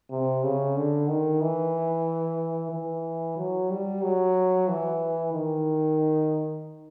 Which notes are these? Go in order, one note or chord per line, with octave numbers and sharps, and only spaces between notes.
C3
C#3
D3
D#3
E3
E3
F#3
G3
F#3
E3
D#3